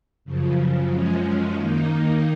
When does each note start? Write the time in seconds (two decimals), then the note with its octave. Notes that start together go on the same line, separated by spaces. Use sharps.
0.25 F#2 C#3 F3
0.90 F#2 F3 G#3 C#4
1.55 D#3 A#3 D#4